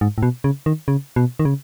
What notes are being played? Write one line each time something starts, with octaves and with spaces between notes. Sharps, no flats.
G#2
A2
B2
C#3
D#3
C#3
B2
D#3
C#3